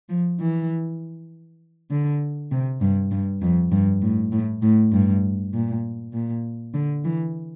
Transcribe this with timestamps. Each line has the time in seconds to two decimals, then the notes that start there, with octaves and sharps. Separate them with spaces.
0.09 F3
0.40 E3
1.91 D3
2.52 C3
2.81 G2
3.12 G2
3.42 F2
3.72 G2
4.02 A2
4.32 A2
4.62 A2
4.93 G2
5.54 A#2
6.14 A#2
6.74 D3
7.04 E3